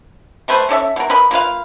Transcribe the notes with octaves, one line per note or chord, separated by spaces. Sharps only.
G3 A3 B4 C5
C#4 A4 D5 E5
B2 A#4
A#4 B4 D#5 B5
A#3 F4 B4 F5